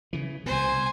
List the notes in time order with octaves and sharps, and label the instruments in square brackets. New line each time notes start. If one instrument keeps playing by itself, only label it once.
[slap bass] C#3 E3
[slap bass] C2 B2 [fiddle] C5 G#5